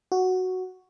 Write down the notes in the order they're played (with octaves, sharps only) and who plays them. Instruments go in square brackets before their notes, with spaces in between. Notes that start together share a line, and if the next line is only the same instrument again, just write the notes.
[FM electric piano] F#4